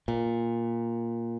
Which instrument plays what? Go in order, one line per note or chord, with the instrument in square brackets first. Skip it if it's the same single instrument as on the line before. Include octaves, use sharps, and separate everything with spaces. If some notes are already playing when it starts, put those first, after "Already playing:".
[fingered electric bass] A#2